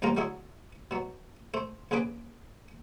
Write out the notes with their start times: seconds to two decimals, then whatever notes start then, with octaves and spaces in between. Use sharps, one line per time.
0.02 A#1 E2 A2 G3 F4 A#5
0.17 D3 F#3 G#3 E4 G#4
0.91 B2 F#3
1.54 A3 C5
1.91 A#1 C#3 G#4 B4 D6